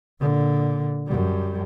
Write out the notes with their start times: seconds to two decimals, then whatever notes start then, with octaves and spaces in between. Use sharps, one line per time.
0.20 A#2 D3
1.07 F#2 G3